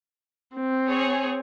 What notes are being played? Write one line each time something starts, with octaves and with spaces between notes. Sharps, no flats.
C4
G#4 C#5